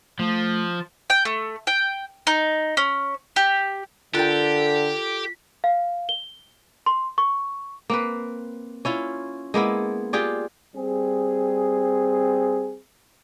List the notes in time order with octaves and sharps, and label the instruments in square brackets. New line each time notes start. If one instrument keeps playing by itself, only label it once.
[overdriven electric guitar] F3 [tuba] A3
[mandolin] G5
A3
G5
D#4
C#4
G4
[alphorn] D3 [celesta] F4 F#6 A6 [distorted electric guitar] G4 [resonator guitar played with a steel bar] A4 A#4 G5
[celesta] F5
G7
C6
C#6
[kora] A#3 C4 B4
C#4 E4 F4
G#3 A#3 B3 E4
F4 G4 G#4 D5
[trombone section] G3 C4 G#4